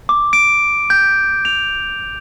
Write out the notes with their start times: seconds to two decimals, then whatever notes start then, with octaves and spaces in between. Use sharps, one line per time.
0.09 D6
0.33 D7
0.90 G6
1.45 F7